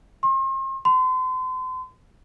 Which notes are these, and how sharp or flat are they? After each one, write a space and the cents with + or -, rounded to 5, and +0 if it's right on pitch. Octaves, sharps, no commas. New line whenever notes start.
C6 +40
C6 -40